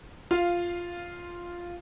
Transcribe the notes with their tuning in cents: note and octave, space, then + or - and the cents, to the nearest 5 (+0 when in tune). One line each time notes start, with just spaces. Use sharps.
F4 +0 F5 -10